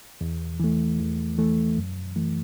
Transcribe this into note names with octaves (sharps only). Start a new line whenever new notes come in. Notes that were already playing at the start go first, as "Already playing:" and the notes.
E2
E3 A3
E2
E3 A3
F#2
E3 A3